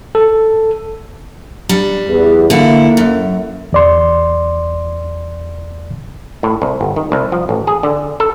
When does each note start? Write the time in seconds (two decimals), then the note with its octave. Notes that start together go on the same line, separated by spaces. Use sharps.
0.15 A4
1.69 G3 D4
2.07 E2
2.50 D3 A#3 E4
2.97 F#2
3.73 E2 D5 C6
6.43 A2
6.62 C2
6.81 G1
6.96 D#3
7.12 C2
7.32 F3
7.49 A1
7.67 G#4
7.83 D3
8.20 A4